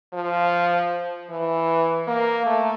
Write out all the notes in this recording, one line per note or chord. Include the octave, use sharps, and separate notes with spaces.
F3
E3
A#3
A3